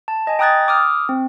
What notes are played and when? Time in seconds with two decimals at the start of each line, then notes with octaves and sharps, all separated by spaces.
0.08 A5
0.27 D#5 G#5
0.39 G5 A#5 D#6 F#6 G#6 A6
0.68 D6 D#6 F6
1.09 C4